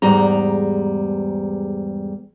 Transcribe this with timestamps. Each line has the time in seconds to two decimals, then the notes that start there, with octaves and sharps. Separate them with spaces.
0.02 E2 G#2 G3 A#5